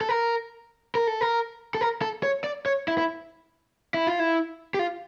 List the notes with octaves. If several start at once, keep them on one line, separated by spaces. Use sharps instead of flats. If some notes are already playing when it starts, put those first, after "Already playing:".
A4
A#4
A#4
A4
A#4
A4
A#4
A4
C#5
D5
C#5
E4
E4
E4
F4
E4
G4
F4